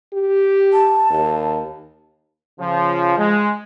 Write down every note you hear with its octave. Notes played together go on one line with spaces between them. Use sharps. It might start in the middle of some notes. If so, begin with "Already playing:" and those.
G4
A5
D#2
C#3 F3
G#3